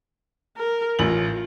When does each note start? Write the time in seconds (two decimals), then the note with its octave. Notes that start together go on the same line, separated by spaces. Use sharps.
0.57 A#4
0.99 A1 A2 F4 F#7